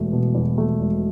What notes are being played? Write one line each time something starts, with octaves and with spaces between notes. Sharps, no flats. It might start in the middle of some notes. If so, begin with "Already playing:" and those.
Already playing: E1 E2 A3
B2
E2
A3
E1